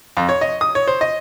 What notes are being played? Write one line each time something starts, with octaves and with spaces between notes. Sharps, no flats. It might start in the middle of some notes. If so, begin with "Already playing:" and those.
F2
C#5
D#5
D#6
C#5
C5
D#5